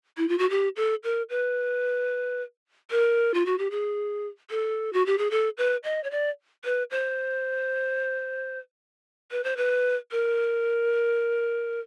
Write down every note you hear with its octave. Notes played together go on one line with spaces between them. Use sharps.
E4
F4
F#4
G4
A4
A#4
B4
A#4
F4
F#4
G4
G#4
A4
F#4
G4
G#4
A4
B4
D#5
C#5
D5
B4
C5
B4
C5
B4
A#4